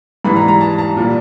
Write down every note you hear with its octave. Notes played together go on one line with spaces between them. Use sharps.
G#2 E3 G3 B5
A#5
A#5
A5
A5
A#2 G3